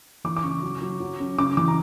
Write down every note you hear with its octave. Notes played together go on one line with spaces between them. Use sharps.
E3 D6
D6
C#3 C#6
F#3
F#3
F#3
C#4
C#3 D6
E3 D6
A#5